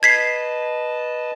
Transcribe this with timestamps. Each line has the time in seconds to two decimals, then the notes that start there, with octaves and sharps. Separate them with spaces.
0.03 B4 D#5 A5 G#6 B6 C7